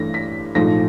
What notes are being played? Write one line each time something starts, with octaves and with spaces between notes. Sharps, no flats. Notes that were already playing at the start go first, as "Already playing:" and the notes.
Already playing: G2 E3 A3 A#6
B6
A#1 G#2 F3 A3 A#6